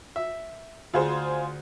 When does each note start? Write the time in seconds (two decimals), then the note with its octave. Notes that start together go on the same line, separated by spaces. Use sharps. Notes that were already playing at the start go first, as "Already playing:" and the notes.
0.16 E5
0.94 D2 F4 G#4 C5